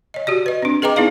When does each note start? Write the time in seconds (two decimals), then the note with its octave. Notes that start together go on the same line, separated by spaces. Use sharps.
0.14 C#5 D#5
0.27 F#4 G4 D5
0.46 B4 D#5
0.62 C4 D4
0.82 G#4 B4 D#5 G5 A#5 D6
0.96 B3 D#4 E4 G#4 D5 F5